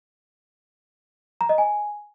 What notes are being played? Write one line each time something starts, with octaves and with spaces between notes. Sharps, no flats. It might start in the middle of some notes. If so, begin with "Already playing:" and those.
A#5
D#5
G#5